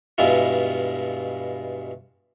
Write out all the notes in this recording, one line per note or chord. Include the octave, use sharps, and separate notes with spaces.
G2 B2 G#3 E4 F4